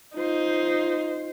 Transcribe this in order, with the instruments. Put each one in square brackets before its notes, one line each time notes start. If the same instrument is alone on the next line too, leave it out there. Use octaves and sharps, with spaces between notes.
[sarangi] D#4 [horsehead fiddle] F4 C5